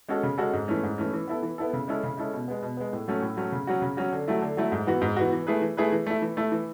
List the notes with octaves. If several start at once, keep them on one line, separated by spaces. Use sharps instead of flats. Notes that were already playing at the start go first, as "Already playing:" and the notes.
G#3 C#4 F#4 A4
C#3
G#3 C#4 F#4 A4
G#2
E3 A3 C#4
G#2
E3 A3 C#4
E3
B3 E4 A4
E3
B3 E4 A4
C#3
G#3 C#4 E4 A4
C#3
G#3 C#4 E4 A4
B2
G#3 B3
B2
G#3 B3
A2
F#3 A3 C#4
A2
F#3 A3 C#4
C#3
F#3 C#4 F#4
C#3
F#3 C#4 F#4
D3
F#3 A3 E4
D3
F#3 A3 E4
G#2
E3 B3 F#4
G#2
E3 B3 F#4
E3
A3 E4 G#4 B4
E3
A3 E4 G#4 B4
E3
A3 E4
E3
A3 E4
E3